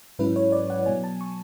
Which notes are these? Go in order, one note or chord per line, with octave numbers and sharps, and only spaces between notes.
G#2 F#3 C#4 E4 B4
C#5
D5
F#5
B2 F#3 B3 G#5
A5
C#6